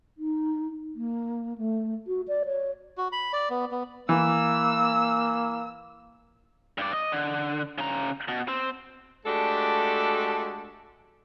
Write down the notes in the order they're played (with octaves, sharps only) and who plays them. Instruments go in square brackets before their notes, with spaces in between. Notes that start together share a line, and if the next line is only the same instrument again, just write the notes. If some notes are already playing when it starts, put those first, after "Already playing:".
[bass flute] D#4
A#3
A3
F#4
D5
C#5
[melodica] F#4
B5
D5
B3
B3
[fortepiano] E3 [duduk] A#3 [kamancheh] E6
[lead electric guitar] G2 D5
D#5
D3
C#3 A#5
B2
C4
[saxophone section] G#3 A3 D4 F#4 G4 A4